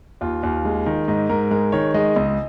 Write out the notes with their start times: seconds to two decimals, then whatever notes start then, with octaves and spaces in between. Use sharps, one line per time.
0.21 D#2 F4
0.43 D#2
0.65 G#3
0.86 D#3
1.08 G#2 D#5
1.29 G#2 A#4
1.51 G#3 A#4
1.72 D#3 C#5
1.94 G#3 D#5
2.16 C#2